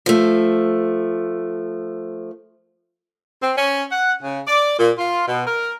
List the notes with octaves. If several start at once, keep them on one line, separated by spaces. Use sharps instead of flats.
F3 A3
C4
C#4
F#5
C#3
D5
A#2
F4
B2
A#4